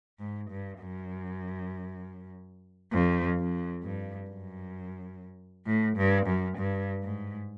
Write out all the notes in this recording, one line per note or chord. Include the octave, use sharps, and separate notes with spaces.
G#2
G2
F#2
F2
F2
G2
F#2
A2
G2
F#2
G2
G#2